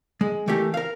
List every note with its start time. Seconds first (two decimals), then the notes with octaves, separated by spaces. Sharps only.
0.21 G#3
0.48 E3 A3 A#3 G4
0.74 A#4 F5